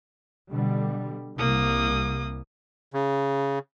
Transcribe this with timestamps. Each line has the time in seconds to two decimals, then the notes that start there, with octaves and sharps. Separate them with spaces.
0.52 B2 D3 G3
1.38 C2 A#3 D#6
2.94 C#3